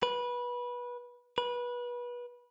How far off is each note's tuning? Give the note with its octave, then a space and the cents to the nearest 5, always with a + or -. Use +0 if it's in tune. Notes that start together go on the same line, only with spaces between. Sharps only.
B4 -20
B4 -25